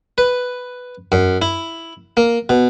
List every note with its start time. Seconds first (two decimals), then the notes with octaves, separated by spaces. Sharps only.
0.18 B4
1.12 F#2
1.42 E4
2.17 A#3
2.49 B2